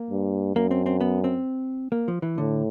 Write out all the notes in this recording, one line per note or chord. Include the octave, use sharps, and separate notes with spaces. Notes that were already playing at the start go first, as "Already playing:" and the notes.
Already playing: A#3
G2
F#2 A#3
C4
C4
B3
C4
A#3
F3
E3
A2 D3